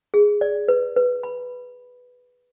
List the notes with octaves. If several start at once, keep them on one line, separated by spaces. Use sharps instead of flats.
G#4
D5
B4
B4
B5